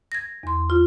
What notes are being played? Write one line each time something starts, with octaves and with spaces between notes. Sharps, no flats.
G#6 A#6
E2 C6
F4